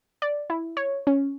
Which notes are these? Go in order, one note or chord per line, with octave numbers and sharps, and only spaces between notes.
D5
E4
C#5
C#4